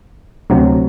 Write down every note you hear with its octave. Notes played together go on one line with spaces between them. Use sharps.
D2 C3 F#3